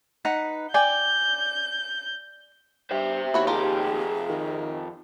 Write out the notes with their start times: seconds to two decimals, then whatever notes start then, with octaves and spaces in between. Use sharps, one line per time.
0.25 D#4 B4 F#5
0.74 D5 G5 G#5 G6
2.91 G2 C5 E5
3.34 D#2 E4 F#4 C#5
3.47 F2 F4 G4 G#4 A#4
4.30 D#3